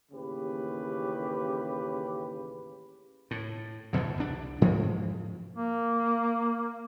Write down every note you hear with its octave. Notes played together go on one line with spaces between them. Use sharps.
A1 D#2 C#3 G4 B4
A2
E2 G2 B2 D3
C2 D4
G#2 F3 G#3
A#3